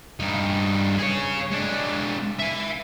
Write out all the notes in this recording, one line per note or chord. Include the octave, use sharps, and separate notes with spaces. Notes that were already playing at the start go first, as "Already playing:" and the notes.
G2 D#4
G#4 C#5
G#3 D4
E5 G#5